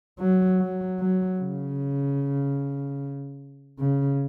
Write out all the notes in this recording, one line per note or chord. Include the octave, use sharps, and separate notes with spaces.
F#3
F#3
F#3
C#3
C#3